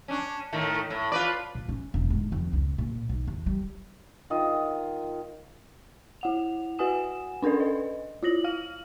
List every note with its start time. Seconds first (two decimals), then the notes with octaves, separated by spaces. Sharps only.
0.08 C#4 D4
0.53 A2 D#3 A3
0.90 A2
1.12 F4 B4 D5
1.55 A#2
1.69 C#4
1.94 E1
2.10 G#2
2.32 F2
2.53 C#2
2.78 A#2
3.09 B1
3.27 E2
3.46 G3
4.30 D#3 F4 D#5
6.21 E4 F#5 F7
6.79 F#4 B4 F#5 G#5 D#6 E7
7.42 C#4 D4 A4 A#4 D5
7.60 B4 D#5
8.23 E4 F4 A#6 F#7
8.44 F5 F6 F#7